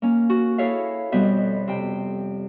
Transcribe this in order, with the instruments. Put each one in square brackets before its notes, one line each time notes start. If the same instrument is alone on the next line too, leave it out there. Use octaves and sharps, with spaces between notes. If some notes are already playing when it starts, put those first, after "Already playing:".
[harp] A#3 C#4
F#4
E4 G#4 A4 C#5 E5 F5
F2 B2 G3 B3 E5 G6
C3 G5